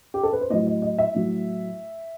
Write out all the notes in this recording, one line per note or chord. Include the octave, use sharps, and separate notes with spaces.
G4
A4
B4
C5
A2 F#3 D#5
D#5
D#5
E5
A2 F#3